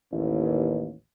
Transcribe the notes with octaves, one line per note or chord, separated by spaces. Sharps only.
A1 D#2